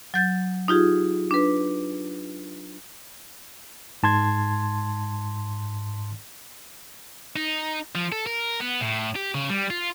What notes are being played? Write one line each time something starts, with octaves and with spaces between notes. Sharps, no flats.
F#3 G6 A6
D#4 F4 G4 G#4
D4 B4
G#2 A5 C6 G#6
D#4
F3
A4
A#4
B3
A2
G4
C#3
G3
F4